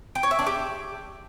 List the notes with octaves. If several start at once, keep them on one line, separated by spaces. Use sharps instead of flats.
G5
C#5
E5
D4
G4